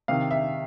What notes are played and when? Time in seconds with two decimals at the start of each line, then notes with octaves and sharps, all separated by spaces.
0.08 C3 D#3 F5
0.31 E5